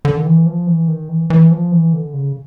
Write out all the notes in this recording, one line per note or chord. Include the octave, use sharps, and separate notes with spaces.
D3
D#3
E3
F3
E3
D#3
E3
E3
F3
E3
D3
C#3